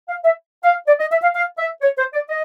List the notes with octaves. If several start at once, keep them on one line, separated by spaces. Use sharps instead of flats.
F5
E5
F5
D5
D#5
E5
F5
F5
E5
C#5
C5
D5
D#5